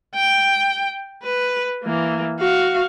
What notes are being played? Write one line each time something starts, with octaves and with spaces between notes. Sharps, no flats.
G5
B4
E3 A#3
F#4 F5